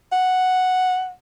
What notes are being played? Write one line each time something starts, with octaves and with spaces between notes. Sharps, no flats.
F#5